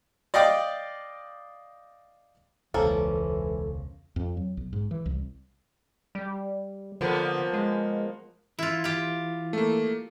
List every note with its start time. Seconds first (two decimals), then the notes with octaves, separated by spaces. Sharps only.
0.34 D5 D#5 F5 G5 D6
2.74 E1 C#2 E3 F3 A#3 C#4 A4
4.16 F2
4.37 F#3
4.57 B1
4.73 G#2
4.91 E3
5.06 C2
6.15 G3
7.01 D3 F3 A#3 B3
7.53 G#3
8.59 E3 E4 F4
8.84 F4 G4
9.53 A3 A#3